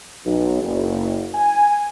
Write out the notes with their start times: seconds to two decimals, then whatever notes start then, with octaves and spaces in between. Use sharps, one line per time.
0.25 B1
0.62 F#1
1.34 G#5